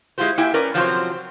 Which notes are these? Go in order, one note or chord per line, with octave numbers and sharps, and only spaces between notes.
G#3 E4 F4 G4 C5
A#3 E4 G4 E5 G5 G#5
C#4 A#4 B4 D5
C3 F3 F#3 C4 E4 C5